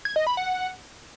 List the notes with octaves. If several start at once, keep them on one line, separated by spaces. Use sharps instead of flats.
G#6
D#5
B5
F#5